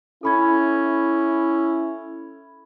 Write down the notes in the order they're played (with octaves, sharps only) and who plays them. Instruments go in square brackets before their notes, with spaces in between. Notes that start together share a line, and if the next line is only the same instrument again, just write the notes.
[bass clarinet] C#4 [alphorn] E4 [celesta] A4 B5 G#6